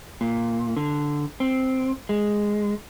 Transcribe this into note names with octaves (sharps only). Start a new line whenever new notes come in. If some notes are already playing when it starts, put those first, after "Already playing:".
A#2
D3
C4
G#3